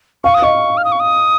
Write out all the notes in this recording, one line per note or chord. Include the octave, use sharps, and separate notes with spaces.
F5 C#6
D#6
D#5 C#6
F6
D#6
C#6
D#6